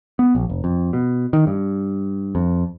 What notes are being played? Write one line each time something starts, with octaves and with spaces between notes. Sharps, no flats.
B3
A#1
F1
F2
B2
D#3
G2
F2